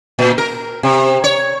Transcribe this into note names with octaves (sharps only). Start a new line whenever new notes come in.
A#2
A#4
C3
C#5